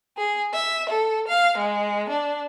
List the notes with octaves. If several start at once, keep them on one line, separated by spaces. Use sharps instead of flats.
G#4
E5
A4
F5
G#3
D4